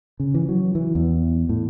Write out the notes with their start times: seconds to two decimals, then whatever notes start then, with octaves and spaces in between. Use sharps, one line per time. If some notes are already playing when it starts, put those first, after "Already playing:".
0.20 C#3
0.34 E3
0.49 F#3
0.75 E3
0.95 E2
1.49 A2